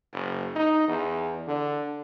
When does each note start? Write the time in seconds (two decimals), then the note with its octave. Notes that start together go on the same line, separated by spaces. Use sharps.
0.13 F#1
0.56 D#4
0.88 E2
1.47 D3